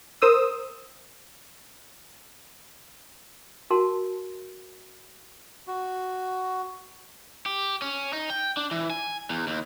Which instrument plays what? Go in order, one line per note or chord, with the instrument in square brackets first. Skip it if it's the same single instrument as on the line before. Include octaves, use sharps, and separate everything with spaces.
[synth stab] A#4 C5 D#6 E6
[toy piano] F#4 A#4 A5 C6
[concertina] F#4
[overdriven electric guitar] G4
C#4
D#4
G5
D4
E3
G#5
E2
D#2